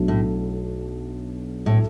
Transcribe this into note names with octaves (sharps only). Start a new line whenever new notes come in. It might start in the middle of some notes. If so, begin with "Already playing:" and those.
Already playing: B1 B2 F#3 A3 D4
A2
A2